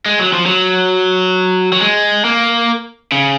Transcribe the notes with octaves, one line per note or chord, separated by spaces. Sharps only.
G#3
F#3
F3
F#3
F#3
G#3
A#3
C#3